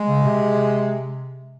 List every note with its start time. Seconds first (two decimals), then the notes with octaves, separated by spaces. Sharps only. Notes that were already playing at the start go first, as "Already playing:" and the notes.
Already playing: G#3
0.08 C#3
0.24 C3